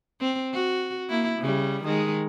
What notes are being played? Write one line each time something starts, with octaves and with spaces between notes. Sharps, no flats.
C4
F#4
A#3 E4
C#3 G3
D#3 G#3